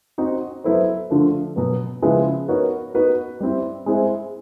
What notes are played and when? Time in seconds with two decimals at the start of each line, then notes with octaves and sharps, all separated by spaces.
0.18 C4 D#4 F#4
0.64 F#3 B3 E4 A4 C5
1.10 D3 F3 A3
1.56 B2 F#3 B3
2.02 C#3 F3 G#3 B3 E4
2.48 B3 D#4 F#4 A#4 C#5
2.94 B3 D#4 F#4 B4
3.40 G3 C4 E4
3.86 G#3 C4 E4 G#4 C5